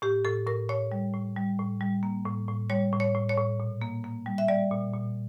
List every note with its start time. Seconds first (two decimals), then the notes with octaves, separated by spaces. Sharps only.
0.02 A2 G4
0.25 A2 A4
0.47 A2 A#4
0.69 A2 C#5
0.92 G3
1.13 A2
1.36 G3
1.59 A2
1.81 G3
2.03 A#3
2.26 A2
2.48 A2
2.70 G3 C#5
2.92 A2
3.00 C#5
3.15 A2
3.29 C#5
3.37 A2
3.60 A#2
3.82 A#3
4.04 A#3
4.26 G3
4.38 E5
4.48 G3 D5
4.71 A#2
4.93 A#2